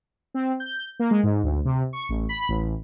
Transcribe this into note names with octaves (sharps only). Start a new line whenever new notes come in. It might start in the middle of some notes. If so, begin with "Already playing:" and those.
C4
G6
A#3
G#3
G#2
D2
C3
C#6
A1
B5
A1